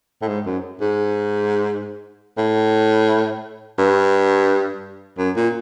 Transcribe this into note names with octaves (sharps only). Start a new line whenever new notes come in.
A2
G#2
F#2
G#2
A2
G2
F#2
A#2